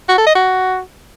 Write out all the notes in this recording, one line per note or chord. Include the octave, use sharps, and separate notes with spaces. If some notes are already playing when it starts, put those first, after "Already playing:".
F#4
A4
D#5
F#4